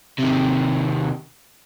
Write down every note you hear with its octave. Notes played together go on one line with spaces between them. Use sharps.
C3 D#3